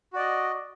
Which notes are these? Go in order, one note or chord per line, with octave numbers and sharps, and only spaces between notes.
F#4 D5 D#5